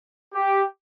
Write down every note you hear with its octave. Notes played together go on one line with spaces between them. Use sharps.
G4